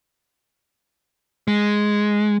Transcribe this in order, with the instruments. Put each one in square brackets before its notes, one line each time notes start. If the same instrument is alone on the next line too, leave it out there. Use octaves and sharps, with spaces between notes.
[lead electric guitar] G#3